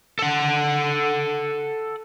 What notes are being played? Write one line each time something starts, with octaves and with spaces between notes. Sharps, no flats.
A4 F#5